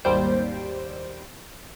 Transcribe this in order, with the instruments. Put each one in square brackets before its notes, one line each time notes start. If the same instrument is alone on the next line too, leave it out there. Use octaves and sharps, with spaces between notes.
[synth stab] G#1 D#2 G3 C5 D7